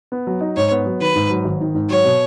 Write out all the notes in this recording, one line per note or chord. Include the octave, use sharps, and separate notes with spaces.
B3
F#3
D#4
G#2 C#5
B3
F#3
D#3 B4
G#2
F#3
G#1
D#3
G#2
F#3 C#5
B2